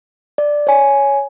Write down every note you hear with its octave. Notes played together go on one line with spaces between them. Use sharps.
D5
C#5 G#5